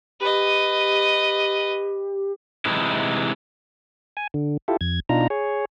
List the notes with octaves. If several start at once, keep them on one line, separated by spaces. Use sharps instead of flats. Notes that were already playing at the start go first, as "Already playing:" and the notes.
G4 B4 D#5
C3 E3 G#3 D#4 E4
G#5
D3
E4 F4 G4 A4
F2 G#6
B2 D4 D#4 F4 A#5
G#4 C#5